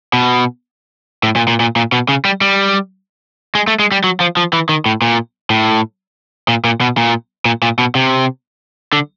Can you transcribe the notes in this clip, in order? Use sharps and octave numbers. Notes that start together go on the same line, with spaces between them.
B2
A2
A#2
A#2
A#2
A#2
B2
C#3
G3
G3
G#3
A3
G#3
G3
F#3
F3
F3
E3
D#3
A2
A#2
A2
A#2
A#2
B2
A#2
A#2
A#2
B2
C3
D3